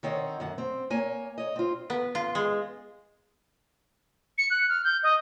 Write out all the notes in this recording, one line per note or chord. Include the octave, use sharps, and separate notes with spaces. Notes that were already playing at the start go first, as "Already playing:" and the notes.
D#3 C4 C#5 D#5 F#5
F#2 D#3 F#5
C4
A#3 C#5 G#5
C#5 D#5
C4 F4
B3
F4
G#3
C#7
F#6
F6
G6
D#5